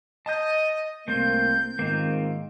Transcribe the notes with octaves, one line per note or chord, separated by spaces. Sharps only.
D#5 A5 G6
C2 A3 A#3 C4 C6 G6
G#2 D#3 A#3 C4 F4